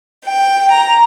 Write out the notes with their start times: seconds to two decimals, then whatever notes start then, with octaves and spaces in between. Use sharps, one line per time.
0.25 G5
0.70 A#5